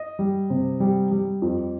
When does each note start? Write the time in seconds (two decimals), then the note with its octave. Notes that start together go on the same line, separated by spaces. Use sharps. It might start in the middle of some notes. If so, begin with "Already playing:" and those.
Already playing: D#5
0.19 G3
0.50 C3
0.80 G3
1.11 G3
1.42 F2